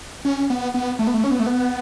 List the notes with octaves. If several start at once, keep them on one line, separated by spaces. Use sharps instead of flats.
C#4
B3
B3
A3
B3
A3
C#4
B3
A3
B3